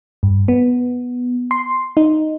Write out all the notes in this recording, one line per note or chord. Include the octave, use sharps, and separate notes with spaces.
G2
B3
C6
D#4